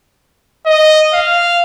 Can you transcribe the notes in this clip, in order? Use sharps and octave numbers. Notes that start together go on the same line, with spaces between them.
D#5
F5